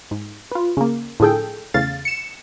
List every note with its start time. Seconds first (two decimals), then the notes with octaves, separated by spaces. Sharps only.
0.11 G#2
0.52 F4 B4
0.77 C#3 A#3
1.20 A2 D3 F3 G#4 A4 G5
1.74 E2 C#3 A3 F5 A6
2.05 C#7 E7